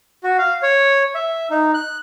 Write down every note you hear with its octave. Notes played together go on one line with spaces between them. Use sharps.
F#4
F5
C#5
E5
D#4
F#6